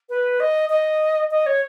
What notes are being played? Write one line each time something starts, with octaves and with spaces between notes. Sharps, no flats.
B4
D#5
D#5
D#5
C#5